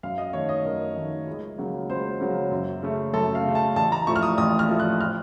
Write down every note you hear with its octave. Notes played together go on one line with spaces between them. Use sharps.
F#2 F5
D#5
D#3 A3 C#5
D#5
F#2 A#4
D#3 A3
C#2
C#3 F#3 A#3
C#2 C5
C#3 F#3 A#3
F#2
C#3 A3
F#2 A4
F5
C#3 A3
A5
A1 A5
A#5
A2 F3 A3 C#6
F6
D#6
A1 D#6
F6
A2 F3 A3
F#6
F6